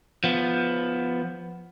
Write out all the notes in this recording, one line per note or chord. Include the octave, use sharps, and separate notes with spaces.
F3 B3